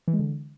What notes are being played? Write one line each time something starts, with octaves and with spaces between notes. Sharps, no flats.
E3
G#3
D3